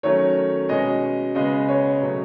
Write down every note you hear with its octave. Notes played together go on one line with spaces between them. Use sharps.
D#3 F#3 A3 C#4 C#5
B2 G#3 C#4 D#5
C#3 G#3 B3 D#5
C#5
B2 F#3 A3 C#4